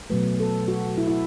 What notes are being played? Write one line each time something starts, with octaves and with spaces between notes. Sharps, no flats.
B2 F#3 A3 B4
A4
F#4
E4
E4